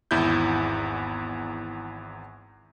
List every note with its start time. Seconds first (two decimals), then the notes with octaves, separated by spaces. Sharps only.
0.11 G#1 E2 E4 G6